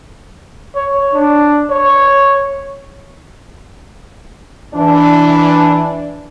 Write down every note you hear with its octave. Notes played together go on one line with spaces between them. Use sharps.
C#5
D4
C#5
E3 D4